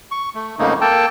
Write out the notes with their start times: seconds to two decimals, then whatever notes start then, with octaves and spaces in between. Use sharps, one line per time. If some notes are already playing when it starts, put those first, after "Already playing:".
0.11 C#6
0.35 A3
0.59 F2 G#2 C#3 A3 A#3 D#4
0.81 A#3 A4 G5 A5